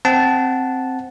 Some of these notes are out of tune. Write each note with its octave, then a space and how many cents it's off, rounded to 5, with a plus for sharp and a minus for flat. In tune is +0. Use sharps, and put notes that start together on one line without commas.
C4 +0 F#5 +0 A5 -10